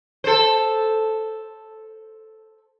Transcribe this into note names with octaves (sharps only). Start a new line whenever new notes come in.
A4 C5